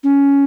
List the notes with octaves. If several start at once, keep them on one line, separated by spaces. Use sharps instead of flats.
C#4